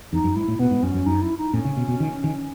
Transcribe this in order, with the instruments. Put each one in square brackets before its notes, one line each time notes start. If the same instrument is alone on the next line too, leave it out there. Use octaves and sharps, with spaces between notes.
[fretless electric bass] E2 [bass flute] D#4
[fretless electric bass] F#2
[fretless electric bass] G#2 [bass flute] E4
[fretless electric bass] A2
[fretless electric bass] B2 [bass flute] B3
[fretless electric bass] G#2
[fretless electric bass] F#2 [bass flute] C#4
[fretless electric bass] F#2
[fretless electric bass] F#2 [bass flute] D#4
[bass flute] E4
D#4
[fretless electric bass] A2 [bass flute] C#4
[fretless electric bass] C#3
B2
B2
D#3
D#3